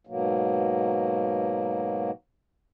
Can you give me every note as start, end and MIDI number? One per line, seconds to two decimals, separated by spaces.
0.07 2.11 44
0.07 2.11 47
0.07 2.11 54
0.07 2.11 58